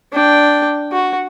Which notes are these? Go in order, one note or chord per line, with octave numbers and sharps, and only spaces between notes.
D4 G5
F#4